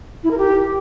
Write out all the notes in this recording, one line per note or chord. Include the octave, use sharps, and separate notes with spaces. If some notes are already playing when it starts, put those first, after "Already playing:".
E4
A#4
G4